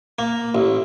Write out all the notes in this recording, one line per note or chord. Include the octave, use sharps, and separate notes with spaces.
A#3
A1